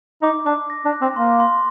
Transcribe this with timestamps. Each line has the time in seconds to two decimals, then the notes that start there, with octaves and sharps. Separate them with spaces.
0.22 D#4 D6
0.46 D4 D6
0.70 A#6
0.85 D4
0.93 F#6
1.02 C4
1.16 A#3 C6
1.40 C6